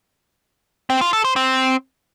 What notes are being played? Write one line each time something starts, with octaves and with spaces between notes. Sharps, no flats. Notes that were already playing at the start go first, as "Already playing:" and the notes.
C4
F4
A4
C5
C4